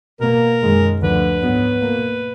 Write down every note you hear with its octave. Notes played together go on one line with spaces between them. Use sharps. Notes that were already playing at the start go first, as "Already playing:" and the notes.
B2 A#3 A#4
F#2 D#3 G#3
D2 D3 F3 B4
G#2 F#3 B3
B2 A#3